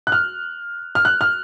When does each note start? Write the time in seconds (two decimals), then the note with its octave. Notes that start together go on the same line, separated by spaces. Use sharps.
0.07 F#6
0.12 F6
0.95 F6
1.05 F#6
1.21 F6